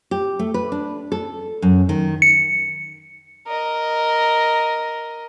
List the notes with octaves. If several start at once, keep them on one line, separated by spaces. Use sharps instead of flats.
G4
A3
B4
D4
A4
F#2
D#3
C#7
A#4 D#5